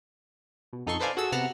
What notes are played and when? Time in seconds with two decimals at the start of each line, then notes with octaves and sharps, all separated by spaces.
0.73 B2
0.86 F2 D#4 A4 C6 C#6
1.00 A4 B4 C5 D5 F5 G#5
1.17 F#4 G#4 A4 E6
1.32 C3 B3 F#5 A5 A#5 F6